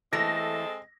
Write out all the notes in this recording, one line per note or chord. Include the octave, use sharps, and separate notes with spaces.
E3 G#3 A3 C4 A4 D#5 A#6